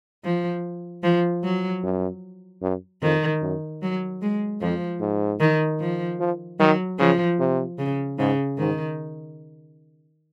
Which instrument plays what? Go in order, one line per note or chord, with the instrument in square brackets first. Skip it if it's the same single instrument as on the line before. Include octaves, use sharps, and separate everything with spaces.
[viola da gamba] F3
F3
F#3
[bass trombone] F#2
F#2
[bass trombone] F2 [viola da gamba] D#3
[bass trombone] F#2
[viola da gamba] F#3
G#3
[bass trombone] F2 [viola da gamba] F3
[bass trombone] G#2
[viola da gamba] D#3
F3
[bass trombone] F3
[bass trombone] D#3 [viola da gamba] F#3
[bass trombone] C#3 [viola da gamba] F3
[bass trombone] C3
[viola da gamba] C#3
[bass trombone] G#2 [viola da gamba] C#3
[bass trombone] G#2 [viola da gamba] D#3